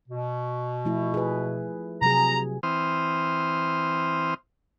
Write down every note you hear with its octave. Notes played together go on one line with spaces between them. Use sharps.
B2
F3 A3 E4
G#4 B4
C3 F#3 G#4 A#5
E3 C4 C5 D#6 F6